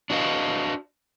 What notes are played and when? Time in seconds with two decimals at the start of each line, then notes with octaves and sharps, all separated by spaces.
0.10 D4 F#4 B4 D#5 F5